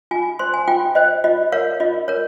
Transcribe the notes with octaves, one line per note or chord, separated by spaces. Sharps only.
F4 G#5
C5 C6
G#5
F4 G5
C5 D#5
F4 D#5
A#4 C#5 F5
F4 D#5
A#4 C#5